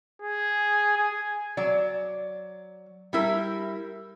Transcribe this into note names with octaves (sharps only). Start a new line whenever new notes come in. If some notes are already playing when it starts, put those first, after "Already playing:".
G#4
G#5
F#3 D5
G3 E4 A#4